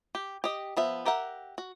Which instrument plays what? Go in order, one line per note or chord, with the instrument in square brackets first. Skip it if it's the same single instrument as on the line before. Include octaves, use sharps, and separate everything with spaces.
[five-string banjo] G4
G4 D#5
F3 B3 E5
G4 A#4 E5 F#5
F#4